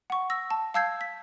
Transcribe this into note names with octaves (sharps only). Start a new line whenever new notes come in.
F#5 C#6
E6 A#6
A5
F5 A5 E6 G6 G#6 C7
B6